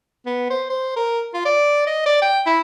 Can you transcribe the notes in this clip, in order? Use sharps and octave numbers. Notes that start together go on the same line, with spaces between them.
B3
C5
C5
A#4
F4
D5
D#5
D5
G5
E4